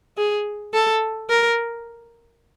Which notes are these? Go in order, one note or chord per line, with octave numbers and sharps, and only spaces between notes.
G#4
A4
A#4